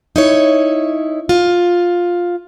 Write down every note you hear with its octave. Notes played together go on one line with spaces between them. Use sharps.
D#4 E4 C#5
F4